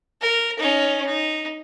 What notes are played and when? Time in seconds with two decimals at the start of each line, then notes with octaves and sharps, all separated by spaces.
0.21 A#4
0.59 C#4 D#4
1.06 D#4